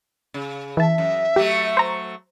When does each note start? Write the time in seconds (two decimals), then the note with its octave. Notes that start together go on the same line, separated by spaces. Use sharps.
0.34 C#3
0.77 E3 E5 A5
0.98 F#2
1.36 F#3 A3 G4
1.77 C5 A#5